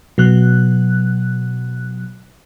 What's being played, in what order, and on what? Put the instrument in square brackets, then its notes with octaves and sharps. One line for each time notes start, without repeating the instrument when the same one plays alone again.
[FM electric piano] B2 F#3 F#6